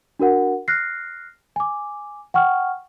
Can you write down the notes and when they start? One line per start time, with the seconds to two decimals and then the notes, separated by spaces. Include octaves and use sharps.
0.20 D4 F#4 A#4 F#5
0.68 F6 F#6 A#6 C7
1.56 G#5 D6
2.34 F#5 G5 C#6 F6